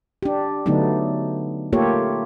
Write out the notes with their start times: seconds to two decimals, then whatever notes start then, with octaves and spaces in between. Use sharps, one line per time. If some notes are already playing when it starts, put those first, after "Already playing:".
0.23 D4 G4
0.66 D3 F#3 A3 B3 D4 D#4
1.73 A3 A#3 F4 G4 A4 C#5